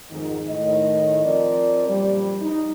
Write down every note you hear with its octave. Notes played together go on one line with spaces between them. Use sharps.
F2 G#2 D#3
A2 D#3 D#5
F3 C4 A#4 D5
F#2 A#2 F3 G3
D#4